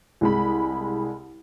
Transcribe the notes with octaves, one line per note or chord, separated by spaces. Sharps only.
C2 G#3 B5